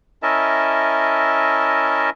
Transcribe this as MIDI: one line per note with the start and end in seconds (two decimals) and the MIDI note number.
0.23 2.10 61
0.23 2.10 64
0.23 2.10 70
0.23 2.10 75
0.23 2.10 76
0.23 2.10 81